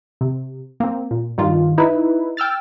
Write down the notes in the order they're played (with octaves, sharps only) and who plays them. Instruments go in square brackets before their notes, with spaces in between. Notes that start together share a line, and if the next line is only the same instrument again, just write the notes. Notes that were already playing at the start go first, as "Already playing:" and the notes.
[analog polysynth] C3
A#3 C4
A#2
G2 D#3 F4
D#4 E4 B4
G5 E6 F6 A6